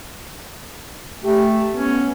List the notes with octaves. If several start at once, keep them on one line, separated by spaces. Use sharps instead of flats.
A3 G4
B3 C#4